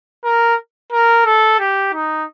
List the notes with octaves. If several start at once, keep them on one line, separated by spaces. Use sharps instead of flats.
A#4
A#4
A4
G4
D#4